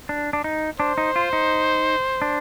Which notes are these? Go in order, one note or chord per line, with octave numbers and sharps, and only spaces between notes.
D4
D4
D#4
D4 C5
D#4
F4
D#4
D4